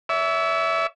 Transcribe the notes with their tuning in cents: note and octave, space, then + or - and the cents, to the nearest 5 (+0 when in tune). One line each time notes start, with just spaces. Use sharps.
C#5 +45 E5 -5